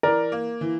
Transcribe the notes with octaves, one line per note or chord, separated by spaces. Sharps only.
E3 A#4 D5
A#3
E3